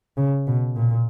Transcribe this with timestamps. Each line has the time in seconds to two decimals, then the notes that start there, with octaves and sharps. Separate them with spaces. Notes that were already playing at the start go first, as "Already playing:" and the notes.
0.17 C#3
0.47 B2
0.76 A#2